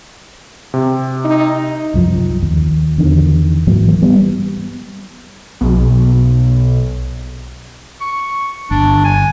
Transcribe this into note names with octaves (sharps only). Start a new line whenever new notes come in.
C3
D#4
C2 F#2 F3
D#2
E2 D3 D#3
G#2 E3 F#3 A#3
G3 B3
B1
C#6
G1 D4
G#5